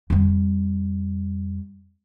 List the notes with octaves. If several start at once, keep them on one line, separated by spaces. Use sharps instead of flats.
F2 G3